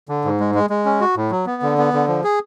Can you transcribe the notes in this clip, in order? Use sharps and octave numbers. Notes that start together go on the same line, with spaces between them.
D3
G#2
G#3
G#3
G#3
C#4
F#4
A2
F#3
B3
D3
B3
D3
F3
G#4